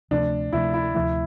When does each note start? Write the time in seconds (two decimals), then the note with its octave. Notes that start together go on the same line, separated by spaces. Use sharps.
0.11 D2 C3 F3 A3 D4
0.52 D2 C3 F3 A3 E4
0.74 E4
0.94 D2 C3 F3 A3 E4